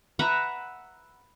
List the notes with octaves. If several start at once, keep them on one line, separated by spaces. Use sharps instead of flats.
B4 E5 F#5 A#5